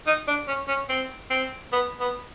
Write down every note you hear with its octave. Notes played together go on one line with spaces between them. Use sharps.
D#4
D4
C#4
C#4
C4
C4
B3
B3